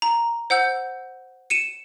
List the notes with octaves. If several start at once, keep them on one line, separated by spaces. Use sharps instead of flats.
A#5
C5 F#5 E6 G6
C#7 D#7 E7